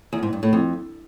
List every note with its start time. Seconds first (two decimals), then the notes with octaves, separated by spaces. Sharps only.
0.13 E2
0.23 G#2
0.33 G2
0.43 A2
0.53 F2